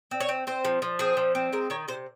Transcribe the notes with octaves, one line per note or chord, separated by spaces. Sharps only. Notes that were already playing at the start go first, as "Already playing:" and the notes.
C4
C#5
C4
C4 C5
F3
F3
C4 G#4
F3
C4
G#3 A#4
D#3 C#5
C3 C5